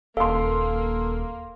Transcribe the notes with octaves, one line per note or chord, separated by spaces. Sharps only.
D#1 A#3 A4 F5 C6